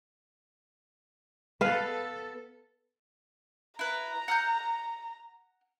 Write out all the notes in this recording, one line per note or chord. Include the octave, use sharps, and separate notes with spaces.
B3 A4 B4 F5
E4 B4 A#5
F#5 F6 G6